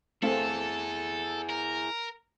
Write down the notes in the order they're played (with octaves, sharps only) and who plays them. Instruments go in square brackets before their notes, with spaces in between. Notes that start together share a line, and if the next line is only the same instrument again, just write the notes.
[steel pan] A3 C4 F5 [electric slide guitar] E4 G#4 [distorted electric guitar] A4
[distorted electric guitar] A#4